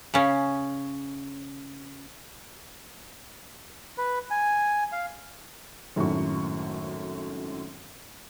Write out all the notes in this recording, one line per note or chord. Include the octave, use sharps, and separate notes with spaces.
C#3 C#4
B4
G#5
F5
G#1 F#2 A2 A3 C#6